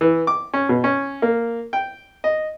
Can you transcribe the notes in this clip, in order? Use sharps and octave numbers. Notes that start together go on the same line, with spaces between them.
E3
D6
C#4
B2
C#4
A#3
G5
D#5